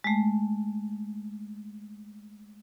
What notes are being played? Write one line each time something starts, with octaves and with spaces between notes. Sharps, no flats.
G#3 A3